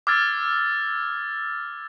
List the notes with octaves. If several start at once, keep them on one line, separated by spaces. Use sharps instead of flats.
D6 E6 F6 G#6 A6